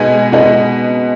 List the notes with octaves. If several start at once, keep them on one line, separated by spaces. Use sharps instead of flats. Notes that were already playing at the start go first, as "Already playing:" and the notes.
Already playing: B2 G#3 B3 D#4 G#5
B2 G#3 B3 D#4